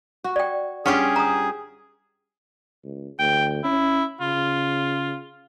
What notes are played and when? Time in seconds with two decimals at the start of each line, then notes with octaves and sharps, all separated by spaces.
0.24 F#4
0.36 D5 G5
0.86 G2 C#4 F4 G4 G#4 F#5 G5 C#6
1.16 A#5 D#6
2.84 C#2
3.19 D2 G5
3.64 C#4 E4
4.21 C#3 F4